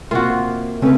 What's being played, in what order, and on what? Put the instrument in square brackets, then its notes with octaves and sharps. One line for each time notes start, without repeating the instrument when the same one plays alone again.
[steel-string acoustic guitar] C3 A#3 [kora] F4 F#4
[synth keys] C#3 C4 C#4 [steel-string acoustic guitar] A3 A#3 B4